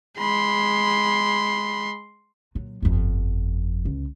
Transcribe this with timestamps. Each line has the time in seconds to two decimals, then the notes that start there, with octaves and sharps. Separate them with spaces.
0.19 G#3 B5 C6
2.55 A#2 F#3
2.82 G1 F2
3.85 C#2